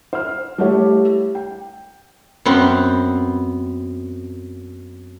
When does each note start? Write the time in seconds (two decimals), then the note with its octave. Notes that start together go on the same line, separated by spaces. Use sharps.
0.13 C5 F6
0.58 G3 A3 E4 G4 A4 C#5
1.35 G5
2.45 F#2 B3 C4